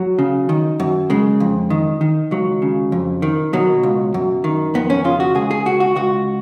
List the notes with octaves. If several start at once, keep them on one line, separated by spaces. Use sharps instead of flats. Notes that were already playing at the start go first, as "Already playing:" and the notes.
Already playing: F#3
C#3
D#3
F#2
C#3 G#3
F2
D#3
D#3
C#2 F#3
C#3
F2
D#3
B2 F#3
C#2
F#2
D#3
F2 B3
C#4
C#3 F4
F#4
C#2 G#4
G#4
C#2 F#4
F#4
C#2 F#4